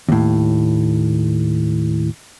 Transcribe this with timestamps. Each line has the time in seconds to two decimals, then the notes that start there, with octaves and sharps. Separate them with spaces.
0.09 D#2 A2